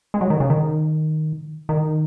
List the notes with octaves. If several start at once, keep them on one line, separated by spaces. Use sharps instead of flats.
G#3
F#3
D#3
C#3
D#3
D#3